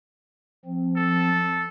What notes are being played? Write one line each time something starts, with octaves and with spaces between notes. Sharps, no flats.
F3 C4
A4